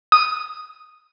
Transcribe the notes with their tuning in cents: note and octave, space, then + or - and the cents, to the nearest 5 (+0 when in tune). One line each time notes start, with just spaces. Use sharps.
D#6 -5